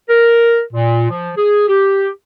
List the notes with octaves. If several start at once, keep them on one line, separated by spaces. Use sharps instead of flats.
A#4
A#2
F3
G#4
G4